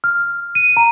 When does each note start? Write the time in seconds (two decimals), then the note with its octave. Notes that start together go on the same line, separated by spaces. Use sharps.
0.04 F6
0.55 D#7
0.77 A#5